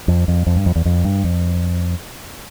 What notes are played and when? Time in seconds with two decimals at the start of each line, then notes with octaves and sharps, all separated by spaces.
0.08 F2
0.28 F2
0.47 F2
0.56 G2
0.66 F2
0.76 E2
0.85 F2
1.04 G2
1.24 F2